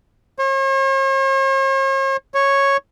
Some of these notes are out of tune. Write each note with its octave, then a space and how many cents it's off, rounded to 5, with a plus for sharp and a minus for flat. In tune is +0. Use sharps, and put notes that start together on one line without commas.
C#5 -45
C#5 -5